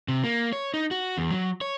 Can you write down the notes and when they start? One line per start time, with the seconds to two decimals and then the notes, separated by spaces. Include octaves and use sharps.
0.08 C3
0.24 A#3
0.53 C#5
0.74 D#4
0.91 F#4
1.18 E2
1.31 F#3
1.61 C#5